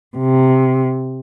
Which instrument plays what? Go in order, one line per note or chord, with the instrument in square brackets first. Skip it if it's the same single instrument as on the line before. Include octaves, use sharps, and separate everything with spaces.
[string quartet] C3